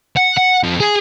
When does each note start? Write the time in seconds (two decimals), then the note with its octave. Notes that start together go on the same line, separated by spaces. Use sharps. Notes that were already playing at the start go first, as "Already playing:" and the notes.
0.17 F#5
0.37 F#5
0.64 F2
0.80 G#4